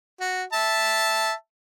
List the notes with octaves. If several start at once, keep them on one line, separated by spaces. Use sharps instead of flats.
F#4
E5 A5